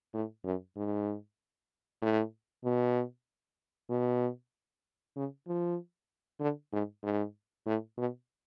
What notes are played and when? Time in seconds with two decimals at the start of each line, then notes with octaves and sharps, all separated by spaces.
0.14 A2
0.45 F#2
0.77 G#2
2.02 A2
2.65 B2
3.90 B2
5.16 C#3
5.47 F3
6.40 D3
6.73 G#2
7.04 G#2
7.66 A2
7.98 B2